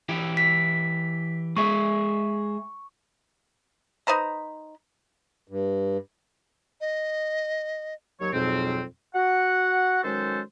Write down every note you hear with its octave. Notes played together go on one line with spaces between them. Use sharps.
E3 E4 G4
B6
G#3 G#4 E5 C#6
D#4 B4 C5 A#5
G2
D#5
D#2 F#3 C#5
F2 G#2 B2 F#3 C4
F#4 F#5
D#3 F#3 G#3 C#4 A4 C5